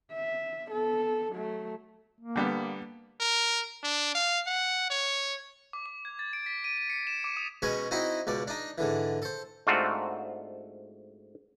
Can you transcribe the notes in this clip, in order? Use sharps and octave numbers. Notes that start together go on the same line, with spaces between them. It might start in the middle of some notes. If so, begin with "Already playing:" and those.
E5
B3 A4
F#3 A3
A#3
D3 G3 B3
A#4
D4
F5
F#5
C#5
D6
D6
G#6
A6
D7
B6
D#7
D#7
C#7
E7
D6
D#6
B2 G#3 C#4 G#5 B5 C#6
C4 D#4 E4 F#4 D#5
C#2 B2 D5
D4 D#4
G#2 D3 E3
A4 C5
G#2 A3 C4 D4 F4 F#4